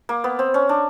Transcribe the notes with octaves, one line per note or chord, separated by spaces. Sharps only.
A#3
B3
C4
C#4
D4